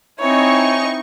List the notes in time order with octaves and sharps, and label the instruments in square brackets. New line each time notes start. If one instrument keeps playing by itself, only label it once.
[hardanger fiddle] C4 E4 [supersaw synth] D#4 C#6 [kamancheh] C#5 G#5